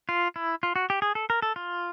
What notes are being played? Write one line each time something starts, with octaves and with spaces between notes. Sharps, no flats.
F4
E4
F4
F#4
G4
G#4
A4
A#4
A4
F4